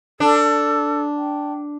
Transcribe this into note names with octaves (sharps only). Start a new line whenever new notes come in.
D4 A4
G5